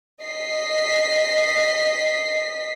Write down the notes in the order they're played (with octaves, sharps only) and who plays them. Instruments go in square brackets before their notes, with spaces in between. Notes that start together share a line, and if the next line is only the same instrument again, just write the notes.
[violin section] D#5 B6 C7